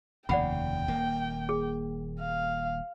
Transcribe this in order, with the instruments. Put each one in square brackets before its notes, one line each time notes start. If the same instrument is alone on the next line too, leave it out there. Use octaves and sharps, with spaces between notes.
[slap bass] F1 D#2 C#3 [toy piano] D5 F#5 B5 [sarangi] G5
[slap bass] D#1 A#3
[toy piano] G#4
[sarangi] F5